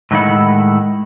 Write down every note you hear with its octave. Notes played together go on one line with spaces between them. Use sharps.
A2 D3 D#3 G#3 E4 F#5